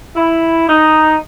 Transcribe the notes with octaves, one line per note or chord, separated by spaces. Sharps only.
E4
D#4